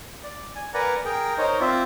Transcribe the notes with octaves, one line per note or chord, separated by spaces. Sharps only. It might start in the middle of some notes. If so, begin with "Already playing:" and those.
D5
G#5
A#4 B4 D5 F#5 G#5 A#5
G#4 A#4 G5 A#5
D#4 A#4 C5 C#5 D#5
C4 F4 C5 D5 E5